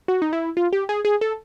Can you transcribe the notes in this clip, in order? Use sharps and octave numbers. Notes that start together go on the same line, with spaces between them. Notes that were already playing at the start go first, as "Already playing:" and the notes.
F#4
D#4
E4
F4
G4
G#4
G#4
A4